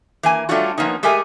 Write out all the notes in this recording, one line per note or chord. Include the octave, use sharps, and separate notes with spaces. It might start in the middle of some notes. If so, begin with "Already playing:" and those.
E3 A#3 G#5
G3 A3 C#4 D4 F4 F#4
F3 A#3 B3 C#4 D#4
G#3 A3 G4 G#4 A#4 G#5